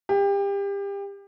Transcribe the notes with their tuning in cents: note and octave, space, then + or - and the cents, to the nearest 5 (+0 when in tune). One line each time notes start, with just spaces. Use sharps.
G4 +30